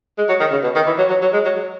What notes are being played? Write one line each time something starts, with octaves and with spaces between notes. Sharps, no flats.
G#3
F#3
D#3
C#3
B2
D#3
E3
F#3
F#3
F#3
G#3
F#3
F#3